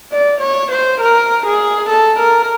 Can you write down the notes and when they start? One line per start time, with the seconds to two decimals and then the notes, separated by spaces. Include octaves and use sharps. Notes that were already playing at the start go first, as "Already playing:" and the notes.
0.12 D5
0.41 C#5
0.71 C5
1.01 A#4
1.46 G#4
1.89 A4
2.19 A#4